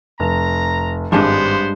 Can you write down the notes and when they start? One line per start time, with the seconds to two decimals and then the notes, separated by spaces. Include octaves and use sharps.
0.20 F1 A#5
1.12 G#1 G2 G#3 B3 D4 C5